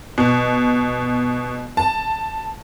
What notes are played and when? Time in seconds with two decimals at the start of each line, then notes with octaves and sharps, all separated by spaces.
0.18 B2
1.77 A5